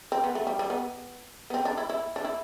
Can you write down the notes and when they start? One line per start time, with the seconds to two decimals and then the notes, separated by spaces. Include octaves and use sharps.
0.12 C4
0.24 B3
0.35 A3
0.47 G3
0.59 G3
0.70 B3
1.50 B3
1.54 C4
1.65 D4
1.78 E4
1.90 E4
2.16 D4
2.24 E4